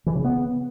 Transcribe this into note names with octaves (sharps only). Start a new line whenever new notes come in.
E3
C#3
B3